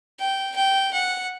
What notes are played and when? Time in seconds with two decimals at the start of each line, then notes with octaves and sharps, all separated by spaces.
0.19 G5
0.56 G5
0.93 F#5